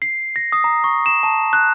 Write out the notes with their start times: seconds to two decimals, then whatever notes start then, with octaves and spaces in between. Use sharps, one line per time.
0.02 C7
0.36 A#6
0.52 D#6
0.64 A#5
0.84 C#6
1.06 E7
1.23 A5
1.53 F#6